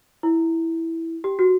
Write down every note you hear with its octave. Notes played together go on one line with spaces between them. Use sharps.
E4
G4
F#4